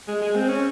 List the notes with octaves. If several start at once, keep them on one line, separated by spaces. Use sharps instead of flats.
G#3
G#3
C4
C#4